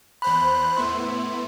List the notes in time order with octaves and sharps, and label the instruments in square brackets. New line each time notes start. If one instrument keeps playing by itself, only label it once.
[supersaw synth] E2 C5 F#6 [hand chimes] B5
[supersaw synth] A2 B3 E4 [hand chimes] C6